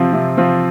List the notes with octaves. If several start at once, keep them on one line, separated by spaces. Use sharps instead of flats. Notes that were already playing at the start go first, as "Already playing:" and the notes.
Already playing: C3 F3 C4 F4
C3
F3 C4 F4